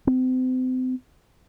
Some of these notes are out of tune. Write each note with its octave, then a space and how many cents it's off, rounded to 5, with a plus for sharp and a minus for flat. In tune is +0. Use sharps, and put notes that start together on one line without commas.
C4 -35